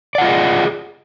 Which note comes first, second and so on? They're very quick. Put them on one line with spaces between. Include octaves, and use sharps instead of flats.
D5 F#5 F4 D#5 G#4